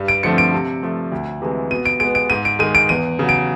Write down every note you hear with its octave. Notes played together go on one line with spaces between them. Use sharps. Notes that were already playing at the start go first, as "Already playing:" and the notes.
Already playing: G2
D7
D3 F3 A3 C4 C#7
D7
C3
F3 A3
D2
C3 E3 G#3
B2 D#7
D7
G#3 B3 D7
D7
G#2 D#7
D7
D#3 G#3 D#7
D7
E2 D#7
C#3 F#3
D7